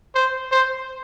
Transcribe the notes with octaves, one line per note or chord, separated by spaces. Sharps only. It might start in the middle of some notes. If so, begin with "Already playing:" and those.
C5
C5